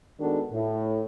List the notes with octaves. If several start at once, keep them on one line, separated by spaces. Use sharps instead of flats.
D#3 G#3 B3 D4 F#4 A4
A2